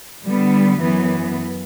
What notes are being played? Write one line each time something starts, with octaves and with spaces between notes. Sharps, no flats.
D3 G3 B3
F#2 E3 B3